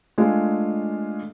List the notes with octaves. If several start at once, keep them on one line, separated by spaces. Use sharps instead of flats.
G#3 A3 D4 F4 G#4